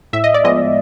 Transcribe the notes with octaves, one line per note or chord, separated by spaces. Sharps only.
A2 E5
D#5
D5
F3 G#3 B3 D#5